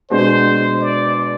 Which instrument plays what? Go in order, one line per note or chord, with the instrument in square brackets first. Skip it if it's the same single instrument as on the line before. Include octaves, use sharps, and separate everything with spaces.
[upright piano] B2 G#3 D4 [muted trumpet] C5
[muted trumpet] D5